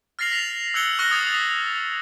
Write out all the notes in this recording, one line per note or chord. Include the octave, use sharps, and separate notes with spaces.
F6 A6 A#6 C7 F7 F#7
A#6 B6 F7
E6 F#6 G#6 C#7 F#7 G7
C#6 F6 F#6 A#6 C#7 G7
D#6 F#6 G#6 A6 C#7
B6